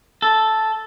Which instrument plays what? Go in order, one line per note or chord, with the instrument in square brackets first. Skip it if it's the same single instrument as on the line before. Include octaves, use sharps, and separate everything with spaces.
[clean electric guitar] A4